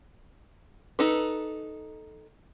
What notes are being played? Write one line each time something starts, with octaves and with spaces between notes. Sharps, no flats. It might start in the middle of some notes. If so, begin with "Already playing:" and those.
D#4 A4 B4